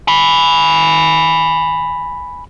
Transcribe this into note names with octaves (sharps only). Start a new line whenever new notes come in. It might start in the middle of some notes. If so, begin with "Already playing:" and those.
G#5 B5